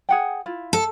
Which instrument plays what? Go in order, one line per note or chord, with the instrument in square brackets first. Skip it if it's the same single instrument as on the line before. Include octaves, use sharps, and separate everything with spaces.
[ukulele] G#4 F#5 G5
E4 F4
[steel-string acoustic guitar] A4